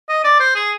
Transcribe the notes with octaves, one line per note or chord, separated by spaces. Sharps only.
D#5
D5
C5
G#4